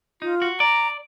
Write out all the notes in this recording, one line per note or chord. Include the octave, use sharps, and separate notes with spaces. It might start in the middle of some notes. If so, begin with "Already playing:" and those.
D#4 F4
F#4
D5 A#5